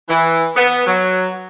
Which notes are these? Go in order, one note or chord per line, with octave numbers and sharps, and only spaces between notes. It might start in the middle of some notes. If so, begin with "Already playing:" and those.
E3
B3
F#3